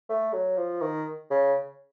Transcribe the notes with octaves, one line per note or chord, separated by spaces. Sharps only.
A3
F#3
F3
D#3
C#3